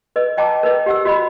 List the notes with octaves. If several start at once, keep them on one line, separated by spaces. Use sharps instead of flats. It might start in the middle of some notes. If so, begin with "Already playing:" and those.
B4 D#5
D#5 G5 A5 A#5 D6
A#4 B4 D#5
G4 F#5 E6
F#4 D#5 B5